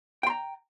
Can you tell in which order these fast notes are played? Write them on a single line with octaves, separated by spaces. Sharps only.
G5 C6 A#5